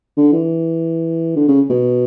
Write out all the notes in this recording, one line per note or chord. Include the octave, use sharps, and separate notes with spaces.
D3
E3
D3
C#3
B2